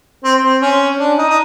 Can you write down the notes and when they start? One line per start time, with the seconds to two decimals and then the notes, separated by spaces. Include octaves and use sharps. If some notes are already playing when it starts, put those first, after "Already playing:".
0.24 C4
0.45 C4
0.62 C#4
0.99 D4
1.18 D#4
1.29 D#4